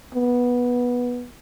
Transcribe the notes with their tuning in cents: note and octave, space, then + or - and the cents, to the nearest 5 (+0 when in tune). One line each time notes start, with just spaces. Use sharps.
B3 -10